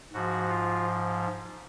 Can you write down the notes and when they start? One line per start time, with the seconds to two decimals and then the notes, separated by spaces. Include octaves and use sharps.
0.13 G#2 F3 F#4
0.49 F4